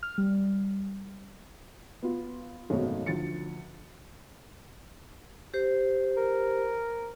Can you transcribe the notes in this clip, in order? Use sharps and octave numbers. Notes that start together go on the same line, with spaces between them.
F6
G3
B3 F4
G#1 F#2 B2 A3 D#4 C#5
D2 F3 A6 C#7
G4 C5
A#4